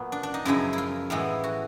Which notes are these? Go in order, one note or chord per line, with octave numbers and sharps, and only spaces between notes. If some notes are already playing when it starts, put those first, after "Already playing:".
Already playing: A#2 F#3 B3
D4
D4
D#4
F#2 C#3 F3 G#3 E4
E4
F4
A2 E3 G#3 B3 E4
F#4